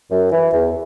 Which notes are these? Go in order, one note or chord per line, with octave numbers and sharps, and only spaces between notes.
F#2
E3
E2